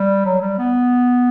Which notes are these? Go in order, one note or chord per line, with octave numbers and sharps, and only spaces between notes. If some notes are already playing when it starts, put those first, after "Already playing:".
Already playing: G3
F#3
G3
B3